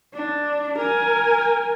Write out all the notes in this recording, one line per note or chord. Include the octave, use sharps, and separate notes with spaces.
D4
A#4 G#5